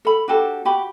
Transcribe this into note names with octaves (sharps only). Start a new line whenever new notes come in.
A4 B5
D4 F#4 G4 A4
F#4 G4 B5